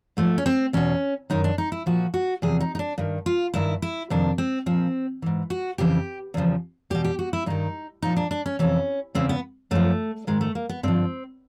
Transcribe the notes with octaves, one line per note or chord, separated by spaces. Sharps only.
G#2 F3 A3
C#4
C4
E2 B2 C#4
F#2 D#3 D#4
D4
D#4
E4
A#2 F3 F#4
F#4
E2 C3 F3 G#4
D#4
D#4
D4
G2 D#3
F4
G2 D#3 E4
E4
F2 C3 D#3 D4
C4
A#2 F3 C4
G#2 E3
F#4
F2 C#3 E3 G4
E2 C#3 F3
E2 B2 G4
G4
F#4
E4
G2 D#3 D#4
A#2 F3 D#4
D4
D4
C#4
F2 C3 E3 C#4
E2 C#3 E3 C4
B3
F#2 D3 F3 A3
G#2 D#3 G#3
A3
A#3
B3
G2 D3 F3 C4